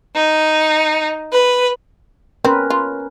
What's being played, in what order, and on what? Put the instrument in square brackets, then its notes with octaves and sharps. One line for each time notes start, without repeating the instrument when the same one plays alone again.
[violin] D#4
B4
[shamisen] C4 [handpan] C#4 A#4 B4
[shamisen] F4